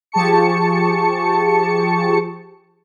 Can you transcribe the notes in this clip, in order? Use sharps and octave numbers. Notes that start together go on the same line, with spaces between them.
F3 G4 G#4 A5 C#6 C#7